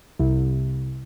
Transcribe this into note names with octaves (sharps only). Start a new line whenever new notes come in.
C2